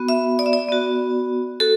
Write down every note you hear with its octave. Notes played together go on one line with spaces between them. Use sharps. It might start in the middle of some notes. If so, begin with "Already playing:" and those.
Already playing: B3 F#4
E5
D5
E5
D5
B3 F#4
F#4 A4